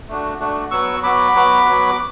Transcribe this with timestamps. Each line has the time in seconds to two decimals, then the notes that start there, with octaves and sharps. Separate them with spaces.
0.08 A3 D4 F#4
0.40 A3 D4 F#4
0.71 F#3 B3 F#4 C#6 E6
1.03 F#3 B3 F#4 B5 D6
1.35 F#3 B3 F#4
1.65 F#3 B3 F#4
1.88 D6